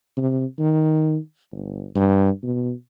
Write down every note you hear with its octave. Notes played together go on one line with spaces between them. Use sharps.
C3
D#3
G1
G2
B2